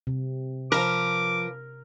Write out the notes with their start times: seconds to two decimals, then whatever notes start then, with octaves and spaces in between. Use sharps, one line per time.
0.07 C3
0.72 F3 A#4 B4 D6